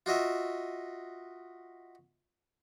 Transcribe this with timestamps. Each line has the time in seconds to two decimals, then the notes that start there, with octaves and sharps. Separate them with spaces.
0.06 F4 F#4 D#5 E5